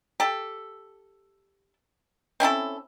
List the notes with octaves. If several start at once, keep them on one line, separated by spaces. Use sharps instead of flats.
G4 A4
C4 C#4 E4 A4